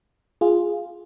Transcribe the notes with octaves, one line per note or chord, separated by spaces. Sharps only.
F4 G#4